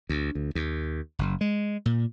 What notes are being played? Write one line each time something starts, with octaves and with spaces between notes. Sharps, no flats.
D2
D2
D#2
F#1
G#3
A#2